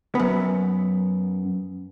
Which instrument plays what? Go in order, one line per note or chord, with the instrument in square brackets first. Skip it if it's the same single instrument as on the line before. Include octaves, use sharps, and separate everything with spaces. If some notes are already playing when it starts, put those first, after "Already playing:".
[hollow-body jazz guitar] F#2 B3